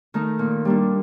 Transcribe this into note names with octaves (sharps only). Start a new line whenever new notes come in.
D#3 A3 D#4
A#2
G3 A#3 D4